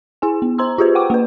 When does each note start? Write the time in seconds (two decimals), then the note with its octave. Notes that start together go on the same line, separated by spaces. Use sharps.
0.22 E4 G#4 G#5
0.42 B3
0.58 C5 A#5 C6 E6
0.78 F4 G4 G#4 B4 C5
0.95 F#5 G5 C#6 D6
1.10 A#3 B4